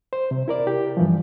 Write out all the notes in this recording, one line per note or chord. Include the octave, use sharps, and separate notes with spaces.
C5
C3
E4 A#4 D5
G4
G2 E3 F3